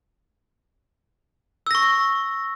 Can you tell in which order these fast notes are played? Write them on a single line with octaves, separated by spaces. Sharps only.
E6 A#6 C#6